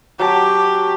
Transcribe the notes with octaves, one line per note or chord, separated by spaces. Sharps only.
F#3 G4 G5 A5